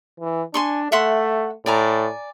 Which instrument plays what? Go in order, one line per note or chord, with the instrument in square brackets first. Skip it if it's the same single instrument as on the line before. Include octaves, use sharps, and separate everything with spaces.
[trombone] E3
[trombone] D4 [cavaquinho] G#5 C6 C#6
[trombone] A3 [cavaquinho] E5 F#5 C6
[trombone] A2 [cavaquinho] D5 G#5 A#5